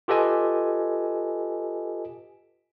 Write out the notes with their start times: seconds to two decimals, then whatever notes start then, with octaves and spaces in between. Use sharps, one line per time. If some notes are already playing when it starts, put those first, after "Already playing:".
0.08 F4 G4 A4 B4 D#5 G#5